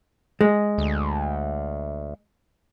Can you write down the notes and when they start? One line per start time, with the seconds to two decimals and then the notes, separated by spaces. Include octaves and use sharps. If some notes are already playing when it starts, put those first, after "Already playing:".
0.41 G#3
0.78 D2